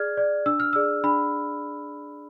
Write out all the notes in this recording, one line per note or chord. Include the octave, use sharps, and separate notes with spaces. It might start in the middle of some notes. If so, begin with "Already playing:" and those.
Already playing: G#4 D5 F6 G#6
D5
D4 E6
F6
G#4 D5 E6
D4 B5